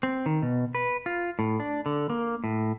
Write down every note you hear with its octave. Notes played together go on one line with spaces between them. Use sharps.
C4
D#3
B2
B4
F4
A2
D4
D3
A#3
A2